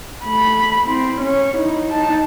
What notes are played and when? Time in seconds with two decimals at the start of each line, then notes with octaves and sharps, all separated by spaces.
0.25 A3 B5
0.87 C4 E4
1.22 C#4 C#5
1.57 D#4 E4
1.92 D#4 A5